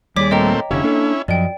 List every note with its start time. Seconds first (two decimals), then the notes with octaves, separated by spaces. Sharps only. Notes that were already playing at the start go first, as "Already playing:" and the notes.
0.16 D#2 G3 G#4 C#5 D5 D6 B6
0.31 A#2 A3 C4 D#5 G5 A#5
0.71 F1 D3 C#4 E4 G4 C#5 F5
0.83 A#3 D4 A4
1.28 F#2 F3 D5 D#5 G5